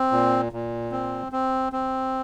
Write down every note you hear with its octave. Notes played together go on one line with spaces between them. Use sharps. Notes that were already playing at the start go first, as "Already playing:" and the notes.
Already playing: C4
A#2
A#2
C4
C4
C4